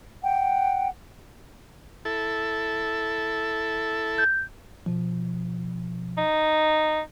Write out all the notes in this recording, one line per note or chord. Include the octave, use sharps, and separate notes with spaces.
F#5 G5
E4 A4
G6
B2 F3
D#4